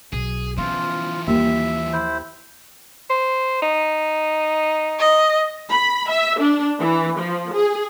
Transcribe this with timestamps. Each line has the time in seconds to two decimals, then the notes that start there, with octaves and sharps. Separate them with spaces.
0.13 B1 G#4
0.57 E3 F3 B3 C#4 F4
1.27 D#2 G3 E5
1.93 E4 C5
3.10 C5
3.62 D#4
4.99 D#5
5.71 B5
6.10 E5
6.39 D4
6.79 E3
7.18 F3
7.53 G#4